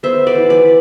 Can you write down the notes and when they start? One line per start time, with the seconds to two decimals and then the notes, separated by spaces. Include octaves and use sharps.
0.03 B3 C5 E5
0.27 B4 D5
0.35 E3
0.50 B4 D5